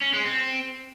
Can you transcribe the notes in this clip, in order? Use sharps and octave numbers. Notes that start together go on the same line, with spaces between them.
C#4
G#3
C4